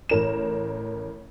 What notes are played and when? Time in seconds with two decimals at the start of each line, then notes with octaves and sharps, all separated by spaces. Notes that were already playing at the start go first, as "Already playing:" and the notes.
0.09 A1 A#4 E7